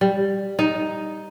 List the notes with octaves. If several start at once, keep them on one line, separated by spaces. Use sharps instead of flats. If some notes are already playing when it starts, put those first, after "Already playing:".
G3
D#4